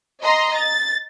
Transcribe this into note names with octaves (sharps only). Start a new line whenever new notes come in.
D#5 A#5 C6
A6